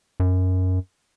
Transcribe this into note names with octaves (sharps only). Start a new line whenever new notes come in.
F#2